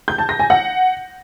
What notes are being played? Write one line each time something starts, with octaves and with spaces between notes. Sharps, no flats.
G6
A5
A#6
G#5
F#5